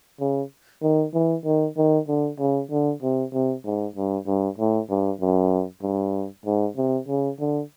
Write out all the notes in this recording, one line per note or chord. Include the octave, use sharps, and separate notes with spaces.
C#3
D#3
E3
D#3
D#3
D3
C#3
D3
C3
C3
G#2
G2
G2
A2
G2
F#2
G2
G#2
C3
C#3
D3